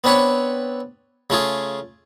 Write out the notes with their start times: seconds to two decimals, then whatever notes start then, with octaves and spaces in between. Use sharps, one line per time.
0.04 B3 C4 D4 B4 C#5
1.30 C#3 A3 F4 G#4